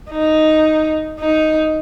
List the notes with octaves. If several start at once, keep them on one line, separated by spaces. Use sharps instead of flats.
D#4
D#4